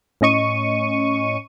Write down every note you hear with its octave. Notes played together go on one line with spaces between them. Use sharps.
A2 C#4 D#5 C#6 D#7